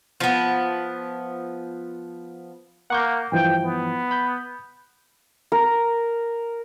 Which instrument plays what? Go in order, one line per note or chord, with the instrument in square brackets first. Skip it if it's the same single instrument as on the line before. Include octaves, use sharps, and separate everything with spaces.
[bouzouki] F3 B3
[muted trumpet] A#3 [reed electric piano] F#5 C#6 G6
[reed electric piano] G2 E3 F3 [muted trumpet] G5
[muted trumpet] B3
[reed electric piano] B5 G6
[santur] A#4